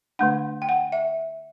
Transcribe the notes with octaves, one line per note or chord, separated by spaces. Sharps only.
D3 A3 D4 F#5
G5
F#5
E5